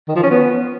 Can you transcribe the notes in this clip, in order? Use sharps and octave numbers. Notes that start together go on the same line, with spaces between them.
D#3
F3
C#4
B3